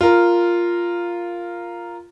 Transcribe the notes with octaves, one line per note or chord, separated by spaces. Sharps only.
F4 A#4